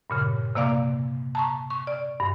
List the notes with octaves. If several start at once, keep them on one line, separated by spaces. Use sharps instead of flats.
G2 A#2 C#3
C3 A#3 D5 F5 D6
A5 A#5 C#6
C#6
D5
G2